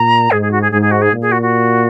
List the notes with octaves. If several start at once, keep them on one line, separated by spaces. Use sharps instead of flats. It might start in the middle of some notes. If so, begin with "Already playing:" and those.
Already playing: A#2 A#5
G#2 G#4
G#4
F#4
G#4
G#2 G#4
G#4
F#4
G#4
A#2
G#4
F#4
F#4